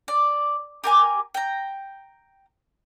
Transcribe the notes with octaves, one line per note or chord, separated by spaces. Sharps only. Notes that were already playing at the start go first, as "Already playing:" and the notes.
D5
G4 A#4 G#5 D6
G5 A#5